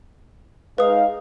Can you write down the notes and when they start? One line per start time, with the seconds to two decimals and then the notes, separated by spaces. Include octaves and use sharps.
0.78 G#3 D#4 B4 F5 D#6